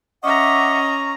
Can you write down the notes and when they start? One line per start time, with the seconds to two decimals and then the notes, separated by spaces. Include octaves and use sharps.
0.24 C#4 D#5 E5 F#5 A#5 C#6 D6